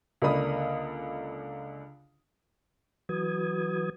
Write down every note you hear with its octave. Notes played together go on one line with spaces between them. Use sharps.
C#2 D3 A#3 D4 B5 D#6
E3 F#3 F#4 B4 D#6 G#6